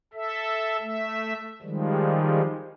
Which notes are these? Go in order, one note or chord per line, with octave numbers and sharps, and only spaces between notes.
A4 E5
A3 E5
D#3 F3 G3 G#3